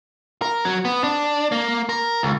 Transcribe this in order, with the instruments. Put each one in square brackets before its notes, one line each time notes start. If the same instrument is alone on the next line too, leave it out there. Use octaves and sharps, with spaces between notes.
[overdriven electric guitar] A#4
F#3
B3
D4
A#3
A#4
C#2